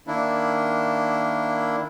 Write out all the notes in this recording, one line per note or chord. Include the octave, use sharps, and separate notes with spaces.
D#3 A#3 D4 E4